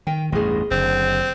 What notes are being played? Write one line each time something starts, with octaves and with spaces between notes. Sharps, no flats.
D#3 G5
A1 E2 G2 G#4 D#5
F#1 D3 C4